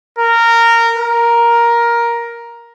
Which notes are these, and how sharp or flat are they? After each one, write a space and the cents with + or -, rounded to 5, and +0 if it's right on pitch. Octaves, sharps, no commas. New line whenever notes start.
A#4 -15
A#4 +10